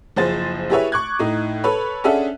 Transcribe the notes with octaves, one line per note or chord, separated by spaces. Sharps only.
F#1 F3 G#4 C5 A6
E4 G4 G#4 B4 C#5 E5
C#6 D6 F#6 G#6
A2 D#4
A4 B4 C#5 B5
C#4 D4 G#4 A4 E5 F#5